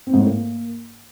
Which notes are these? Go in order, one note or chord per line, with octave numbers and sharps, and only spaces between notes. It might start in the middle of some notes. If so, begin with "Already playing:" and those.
C4
G#2
A2
A#3